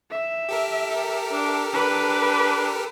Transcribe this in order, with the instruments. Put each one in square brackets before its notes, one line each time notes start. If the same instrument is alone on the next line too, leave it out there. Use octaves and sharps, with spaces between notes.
[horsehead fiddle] E5
[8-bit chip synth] G4 A4 A#4
[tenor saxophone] D4
[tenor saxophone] D4 [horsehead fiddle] B4